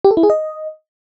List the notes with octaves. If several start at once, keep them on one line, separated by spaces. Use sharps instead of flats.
G4
A4
E4
G#4
D#5